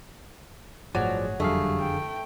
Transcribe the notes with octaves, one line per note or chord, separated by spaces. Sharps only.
G1 A2 F3 F#3 G#4 D5
F#1 F2 D3 F#3 G3 A3 G#4 F5
G5